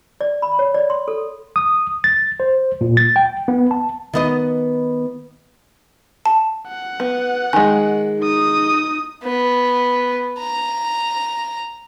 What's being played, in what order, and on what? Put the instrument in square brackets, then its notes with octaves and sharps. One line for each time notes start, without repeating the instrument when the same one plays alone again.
[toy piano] D5
B5
C#5
D5
C6
A4
[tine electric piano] D#6
A6
C5
A#2
A6
G5
B3
A5
[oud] D#3 B3 D#5
[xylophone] A5
[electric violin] F#5
[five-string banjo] B3
[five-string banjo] D#3 G#3 [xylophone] G#5
[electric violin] D#4 D#6
[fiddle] B3
A#5